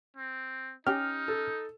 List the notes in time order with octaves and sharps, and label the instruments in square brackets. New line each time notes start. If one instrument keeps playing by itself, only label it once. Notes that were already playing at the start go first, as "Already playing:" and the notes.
[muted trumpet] C4
[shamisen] C#4 G4 [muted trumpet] D#4 [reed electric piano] F6
[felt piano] A4